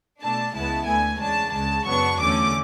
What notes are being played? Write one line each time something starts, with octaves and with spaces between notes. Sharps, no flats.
B2 A3 D4 A5
C#2 C#3 G#3 B3 E4 A5
D2 D3 A3 G#5
E2 C#3 G#3 D4 A5
C#2 C#3 G#3 A5
F#2 C#3 F#3 B3 D4 C#6
E2 D3 A3 C#4 D6